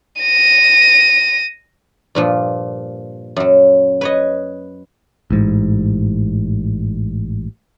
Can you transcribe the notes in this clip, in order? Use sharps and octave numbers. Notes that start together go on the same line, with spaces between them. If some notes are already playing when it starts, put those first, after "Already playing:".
A#6 D#7
G2 A#2 F3
F#2 F#3
B4 C#5 D#5
A1 G#2